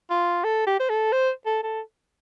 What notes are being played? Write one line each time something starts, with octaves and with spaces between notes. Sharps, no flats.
F4
A4
G4
C5
A4
C5
A4
A4